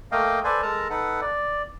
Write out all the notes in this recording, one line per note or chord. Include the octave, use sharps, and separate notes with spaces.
A3 A#3 D#5 F5 G5
A4 B4 C5 D5 G#5
G#3 A4 A#4 A5 A#5
D#4 A4 B4 F#5
D5